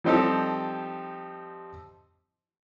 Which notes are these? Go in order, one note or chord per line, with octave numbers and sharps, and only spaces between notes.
F3 G3 C4 D#4 G4 A4